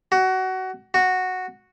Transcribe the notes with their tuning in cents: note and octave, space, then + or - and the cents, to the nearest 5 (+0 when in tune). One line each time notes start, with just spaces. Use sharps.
F#4 +20
F#4 -5